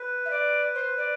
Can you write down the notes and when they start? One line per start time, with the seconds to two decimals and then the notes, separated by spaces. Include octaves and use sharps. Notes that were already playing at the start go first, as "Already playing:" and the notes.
Already playing: B4
0.25 E5
0.30 D5
0.75 C5
0.97 D5